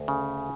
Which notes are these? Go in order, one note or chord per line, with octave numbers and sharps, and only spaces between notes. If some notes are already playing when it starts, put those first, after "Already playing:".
Already playing: D2
C#3